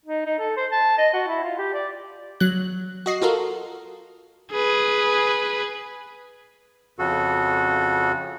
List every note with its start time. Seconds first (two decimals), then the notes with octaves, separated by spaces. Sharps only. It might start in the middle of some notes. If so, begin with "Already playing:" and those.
0.05 D#4
0.25 D#4
0.39 A4
0.57 C5
0.71 A5
0.98 D#5
1.13 F#4
1.28 E4
1.43 F4
1.58 G4
1.73 D5
2.40 F#3 F#6
3.06 F#4 D#5 C7
3.22 F4 F#4 A4 A#4
4.52 G#4 B4
6.99 F2 C#3 F#4 A4